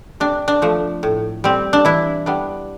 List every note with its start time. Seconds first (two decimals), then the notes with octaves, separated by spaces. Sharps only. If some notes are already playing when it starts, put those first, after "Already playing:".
0.20 C3 D4
0.48 D4
0.62 F3 A3
1.03 A2
1.44 G3 C4
1.73 D4
1.85 E3 E4
2.26 G3 B3 D4